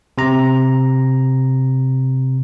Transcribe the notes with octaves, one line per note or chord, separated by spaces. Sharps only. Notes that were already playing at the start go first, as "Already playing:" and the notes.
C3 A#5